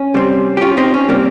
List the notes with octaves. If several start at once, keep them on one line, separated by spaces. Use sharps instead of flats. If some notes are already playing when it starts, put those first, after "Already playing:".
Already playing: C#4
C3 G3 C4
G4
C#4 F4
C4 D#4
C#4
C3 G3 A#3 C4